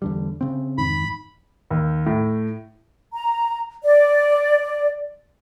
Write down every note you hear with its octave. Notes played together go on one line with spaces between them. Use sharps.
E2 D3 G3
C#3 C4
F2 G#2 D#3 B5
D#2
A2
A#5
D5